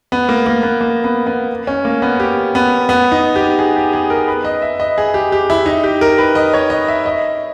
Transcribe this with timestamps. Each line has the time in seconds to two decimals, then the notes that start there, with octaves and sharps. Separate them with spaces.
0.12 B3
0.29 A#3
0.46 A#3
0.63 B3
0.81 A#3
1.04 B3
1.27 B3
1.67 C#4
1.85 A#3
2.02 B3
2.20 G4
2.55 B3
2.89 B3
3.12 D#4
3.36 G4
3.59 G#4
3.76 G4
3.93 G#4
4.10 A#4
4.28 B4
4.44 D#5
4.62 E5
4.80 D#5
4.98 G#4
5.14 G4
5.32 G4
5.50 E4
5.66 D#4
5.84 G4
6.01 A#4
6.18 B4
6.35 D#5
6.53 C#5
6.70 D#5
6.88 E5
7.06 D#5